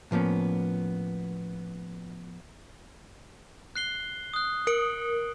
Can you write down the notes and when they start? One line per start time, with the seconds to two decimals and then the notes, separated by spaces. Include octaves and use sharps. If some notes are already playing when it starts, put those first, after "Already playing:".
0.11 A2 F3 A#3 B3 C#4
3.76 F#6 C7 G7
4.34 D#6 F#6
4.67 A#4 D7 F#7